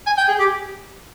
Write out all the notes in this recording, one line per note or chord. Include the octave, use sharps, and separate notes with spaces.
G#5
G5
G#4
G4